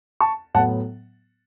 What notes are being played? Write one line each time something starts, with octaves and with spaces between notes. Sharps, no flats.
A5 C#6
A2 F#3 B3 F#5 A5